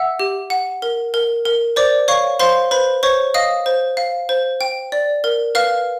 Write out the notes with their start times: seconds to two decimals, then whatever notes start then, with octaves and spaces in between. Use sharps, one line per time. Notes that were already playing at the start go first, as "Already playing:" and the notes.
Already playing: E5 F#5 E6
0.19 G4
0.50 F#5
0.82 A#4
1.14 A#4
1.45 A#4
1.76 C5 D5 D6
2.08 C#5 F5 C#6
2.40 C5 F5 C6
2.71 B4 C5 B5
3.03 C5 C#5 C#6
3.34 D#5 F5 D#6
3.66 C5
3.97 F5
4.29 C5
4.61 G5
4.92 D5
5.24 A#4
5.55 B4 F5 F6